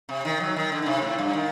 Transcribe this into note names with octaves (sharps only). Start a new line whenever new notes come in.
C3
D#3
F#3
D#3
D3
D3
C3
A2
G2
D#3